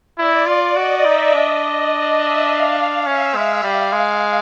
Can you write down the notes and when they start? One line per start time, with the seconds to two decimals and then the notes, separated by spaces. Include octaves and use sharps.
0.19 E4 D5
0.47 F4
0.75 F#4 D#5
1.04 D#4 E5
1.34 D4 D#5
1.91 D#5
2.19 E5
2.48 F5
2.77 F5
3.06 C#4 E5
3.34 G#3 F5
3.63 G3 F5
3.93 G#3